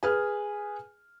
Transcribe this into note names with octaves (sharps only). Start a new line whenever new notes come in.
G#4 B4 F6